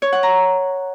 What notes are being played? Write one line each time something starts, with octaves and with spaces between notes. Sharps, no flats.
C#5
F#5
A#5